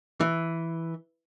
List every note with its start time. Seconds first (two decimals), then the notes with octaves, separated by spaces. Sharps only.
0.21 E3